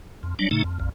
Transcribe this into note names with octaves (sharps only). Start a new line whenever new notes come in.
F2
F#3 G3 D4
A2 C#3 A3 D#4
F2
A#1 F2